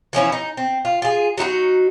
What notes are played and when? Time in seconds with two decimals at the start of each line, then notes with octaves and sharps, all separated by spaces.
0.13 E3 F3 C#4 E4
0.32 D#4
0.57 C4
0.85 F4
1.02 F4 G#4
1.38 F#3 D#4 E4 F#4